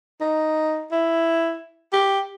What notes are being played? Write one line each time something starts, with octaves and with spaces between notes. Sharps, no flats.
D#4
E4
G4